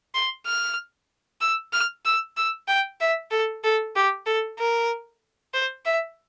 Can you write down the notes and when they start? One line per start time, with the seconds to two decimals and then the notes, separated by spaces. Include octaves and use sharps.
0.15 C6
0.46 F6
1.41 E6
1.73 F6
2.05 E6
2.37 E6
2.68 G5
3.00 E5
3.31 A4
3.64 A4
3.96 G4
4.26 A4
4.59 A#4
5.54 C5
5.85 E5